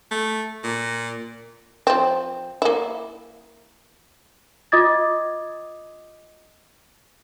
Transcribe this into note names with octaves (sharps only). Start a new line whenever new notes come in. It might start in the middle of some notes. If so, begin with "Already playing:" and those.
A3
A#2
F3 C4
A#3 E4
F4 D#5 D6 D#6 G#6 A6